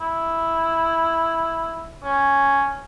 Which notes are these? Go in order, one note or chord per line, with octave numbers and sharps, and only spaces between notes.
E4
C#4